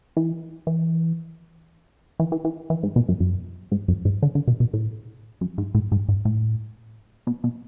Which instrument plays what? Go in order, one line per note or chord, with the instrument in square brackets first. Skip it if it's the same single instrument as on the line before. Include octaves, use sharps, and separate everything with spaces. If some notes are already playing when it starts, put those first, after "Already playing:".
[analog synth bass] E3
E3
E3
E3
E3
E3
G#2
B2
F#2
F#2
G#2
F#2
G#2
D3
D3
B2
B2
A2
F#2
G#2
A2
G#2
G#2
A2
B2
B2